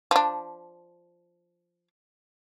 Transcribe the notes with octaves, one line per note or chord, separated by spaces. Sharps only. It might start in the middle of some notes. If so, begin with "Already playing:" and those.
F3 D4